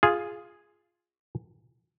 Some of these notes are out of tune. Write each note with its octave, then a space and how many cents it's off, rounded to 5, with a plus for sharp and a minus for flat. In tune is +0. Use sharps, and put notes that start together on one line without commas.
F4 +0 G#4 +0